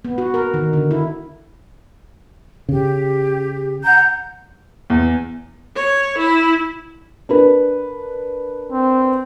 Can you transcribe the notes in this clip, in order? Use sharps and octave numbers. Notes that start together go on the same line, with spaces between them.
B3
F#4
A#4
D#3
D3
E4
C#3 G4
F#5 A#5 G6
E2
C#5
E4
D4 A#4 B4
C4